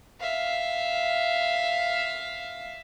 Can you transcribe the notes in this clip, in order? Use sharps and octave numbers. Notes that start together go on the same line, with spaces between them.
E5 F5